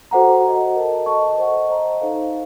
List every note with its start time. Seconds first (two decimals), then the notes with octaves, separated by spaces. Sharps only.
0.11 F#4 A4 C5 F#5 A#5
0.43 A4 C5 D#5
0.75 A#4 D#5 A5
1.06 A4 D#5 A5 C#6
1.38 C5 D#5 F#5
1.69 C5 D#5 A#5
2.01 D#4 A4 C5 F5